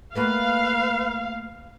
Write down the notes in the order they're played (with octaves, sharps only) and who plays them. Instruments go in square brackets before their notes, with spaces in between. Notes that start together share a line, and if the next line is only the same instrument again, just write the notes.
[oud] A3 A#3 F#4 [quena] B4 [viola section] F5